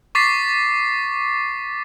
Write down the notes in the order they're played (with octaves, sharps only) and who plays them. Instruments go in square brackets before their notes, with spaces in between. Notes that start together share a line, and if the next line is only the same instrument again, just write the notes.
[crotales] C#6 D6 A6 B6 C7